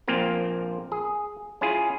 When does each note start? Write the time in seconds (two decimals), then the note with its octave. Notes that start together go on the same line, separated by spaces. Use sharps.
0.08 A#1 A#2 A#3 C4 F4 A#4
0.92 G#4
1.61 C#4 E4 F4 G#4